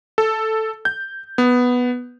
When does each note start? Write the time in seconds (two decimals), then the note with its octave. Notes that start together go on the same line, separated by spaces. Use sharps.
0.18 A4
0.85 G6
1.38 B3